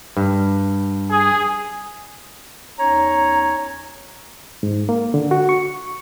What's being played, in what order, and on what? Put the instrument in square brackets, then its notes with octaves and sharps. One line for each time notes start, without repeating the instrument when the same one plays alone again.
[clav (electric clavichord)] G2
[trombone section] G#4
[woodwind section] E2 C#4 D#4 C#5 A#5
[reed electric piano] G#2
A#3
D3
F#4
C#6